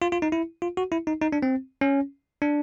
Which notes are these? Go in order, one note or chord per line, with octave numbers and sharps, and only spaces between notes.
F4
F4
D#4
E4
F4
F#4
E4
D#4
D#4
D4
C4
C#4
D4